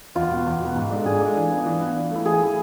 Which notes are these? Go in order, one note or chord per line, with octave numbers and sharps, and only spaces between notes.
E2 F4
B2 B3
E2
B2 B3
G#2
G#3 D4 A4
G#2 G#4
G#3 D4 A4
E3
B3 D4
E3
B3 D4
E3
A3 E4
E3 G#4
A3 E4